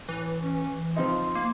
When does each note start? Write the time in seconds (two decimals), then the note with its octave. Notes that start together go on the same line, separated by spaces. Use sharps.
0.09 A2 E3
0.42 C#4
0.96 F3 C4 D#4 F4
1.35 A#3